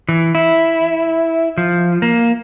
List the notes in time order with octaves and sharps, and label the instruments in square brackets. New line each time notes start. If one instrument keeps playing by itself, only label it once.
[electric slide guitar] E3
E4
F3
A#3